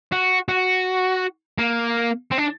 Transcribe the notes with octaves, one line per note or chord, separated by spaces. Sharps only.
F#4
F#4
A#3
C4
D4